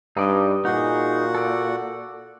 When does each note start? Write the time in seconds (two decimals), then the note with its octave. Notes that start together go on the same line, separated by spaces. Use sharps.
0.17 G2 D#4 D5 D#5
0.65 A#2 D#4 F#4 G#4 F#5
1.35 A4 D5